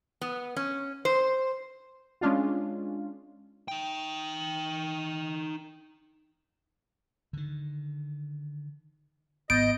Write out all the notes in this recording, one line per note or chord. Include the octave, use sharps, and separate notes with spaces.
B3
C#4
C5
G#3 C#4 D4 F4
D#4 G5
D3 D#3
G#1 G#2 B3 D#5 G6 A6 D7